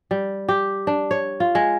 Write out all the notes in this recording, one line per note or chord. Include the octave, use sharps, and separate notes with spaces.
G3
G4
D4
C#5
F4
G#3